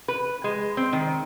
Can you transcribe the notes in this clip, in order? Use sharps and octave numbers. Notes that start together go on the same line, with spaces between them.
B4
G#3
C4
D#3